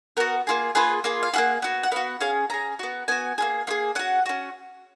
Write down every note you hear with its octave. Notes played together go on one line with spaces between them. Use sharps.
B3 F#4 A#4
A#3 F4 G#4
A#3 F4 G#4 B4
A#3 F4 G#4
F5
A#3 F4 G#4 F#5
B3 F#4
F#5
B3 F#4 F5
C#4 G#4 F5
C#4 G#4 A#5
B3 F#4
B3 F#4 G#5
A#3 F4 G#4
A#3 F4 G#4
C#4 F#4 F#5
C#4 F#4